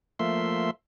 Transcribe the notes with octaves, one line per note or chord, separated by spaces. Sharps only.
F3 A3 A#3 E5 C6